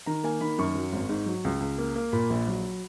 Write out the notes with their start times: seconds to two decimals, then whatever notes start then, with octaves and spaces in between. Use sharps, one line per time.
0.06 D#3 A#5
0.24 A#3 G#5
0.41 D#3 B5
0.58 F#2 C#6
0.75 F#3
0.93 G#1
1.09 G#2
1.26 F#3
1.44 C#2
1.60 C#2
1.78 A#3
1.95 A#3
2.12 A#2 B5
2.30 A#1
2.47 F#3